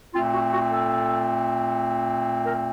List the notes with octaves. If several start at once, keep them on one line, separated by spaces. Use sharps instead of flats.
A#2 A3 C4 F4
F#4
F#4
A4
A#4